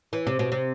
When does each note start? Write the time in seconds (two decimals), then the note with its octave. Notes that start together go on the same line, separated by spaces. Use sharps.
0.13 E3
0.27 C3
0.39 B2
0.52 C3